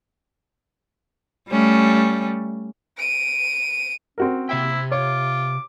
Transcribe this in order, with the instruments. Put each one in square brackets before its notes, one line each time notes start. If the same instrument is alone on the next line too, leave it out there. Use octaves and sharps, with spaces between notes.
[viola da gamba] G3 A3 C#4
[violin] D7 D#7
[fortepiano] C4 F#4 A#4 [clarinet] C#4
[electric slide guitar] C3 E5 G5 [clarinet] A#3 [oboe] E4
[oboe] F4 [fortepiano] C#5 [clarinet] D6